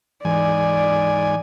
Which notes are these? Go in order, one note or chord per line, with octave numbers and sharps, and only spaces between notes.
G#2 E3 D5 G#5